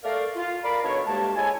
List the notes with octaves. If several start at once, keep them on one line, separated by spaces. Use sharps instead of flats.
A3 A#4 D5 F5
F4
A#4 D5 F5 B5
D#3 B3 D4 F#4 A4 C#5
D2 G2 G#3 A#3 G4 A5
C#3 G#3 E4 A4 C#5 G#5